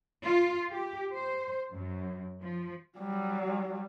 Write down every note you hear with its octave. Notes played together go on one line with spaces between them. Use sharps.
F4
G4
C5
F#2
F3
F#3 G3